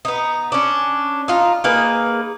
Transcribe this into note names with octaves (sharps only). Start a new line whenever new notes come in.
B3 D#4
C#4 D4
D#4 F4
A#3 D#4 G#4 B4